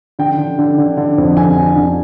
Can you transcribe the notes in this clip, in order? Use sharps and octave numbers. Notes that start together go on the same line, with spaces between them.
D3 G5
D3
D3
D3
D3
F2
F2 G#5
D3
D3